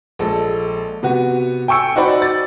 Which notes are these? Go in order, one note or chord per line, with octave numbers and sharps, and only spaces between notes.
A#1 G#3 A4
C3 B3 F#4
G5 G#5 C#6 E6 C#7
D#4 F#4 C5 D5 B5
A6